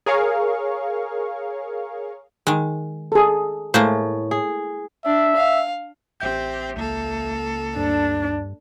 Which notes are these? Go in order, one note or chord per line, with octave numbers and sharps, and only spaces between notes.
G#4 A#4 C#5 F5 C#6
D#3 G#3
G#4 A4
A2 G#3 A#3 C5
G#4
D4 E5
F5
A1 C4 G4 E5 G6
C#2 A#3 A4
D2 G2 D4